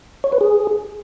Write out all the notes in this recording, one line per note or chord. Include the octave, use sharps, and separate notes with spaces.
C#5
B4
G#4